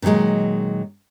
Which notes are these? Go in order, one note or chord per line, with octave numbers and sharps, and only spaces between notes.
A#2 D#3 E3 F#3 G#3